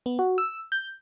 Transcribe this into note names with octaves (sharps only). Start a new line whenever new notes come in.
B3
F#4
E6
G6